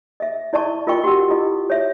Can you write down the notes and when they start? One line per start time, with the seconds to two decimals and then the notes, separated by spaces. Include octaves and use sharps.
0.20 D#5 E5
0.53 E4 D5 D#5 A5 C#6
0.87 F4 A#4 D#5 G5 C#6
1.04 F#4 G4 F#5 E6
1.30 E4 F4 A4 D#5
1.70 C#5 E5